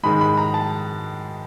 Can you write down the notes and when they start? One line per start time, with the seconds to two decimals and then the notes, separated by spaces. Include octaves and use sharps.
0.03 G#2 D#3 G#3 B5
0.21 B5
0.38 A#5
0.54 A5